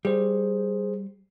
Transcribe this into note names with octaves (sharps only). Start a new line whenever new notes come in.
G3 G#4 C5